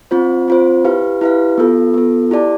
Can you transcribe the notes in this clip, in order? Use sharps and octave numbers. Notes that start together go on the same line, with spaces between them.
C4 F4 C5
C4 F4 C5
E4 G4 B4 F5
E4 G4 B4 F5
B3 F4 A4
B3 F4 A4
E4 G4 D5 A5